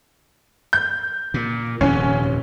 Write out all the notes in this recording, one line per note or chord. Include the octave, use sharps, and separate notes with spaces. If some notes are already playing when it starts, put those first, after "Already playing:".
G6
A#2
D#1 F2 C3 C#4